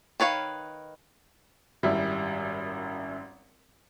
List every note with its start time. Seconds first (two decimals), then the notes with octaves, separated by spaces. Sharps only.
0.20 D#3 B4 C#5 F5
1.83 G#1 F#2 G3 E4 E5